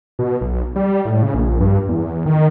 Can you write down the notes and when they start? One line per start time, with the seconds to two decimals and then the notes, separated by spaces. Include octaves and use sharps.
0.19 B2
0.41 B1
0.76 G3
1.05 A2
1.23 C#3
1.34 A#1
1.60 G2
1.89 E2
2.26 D#3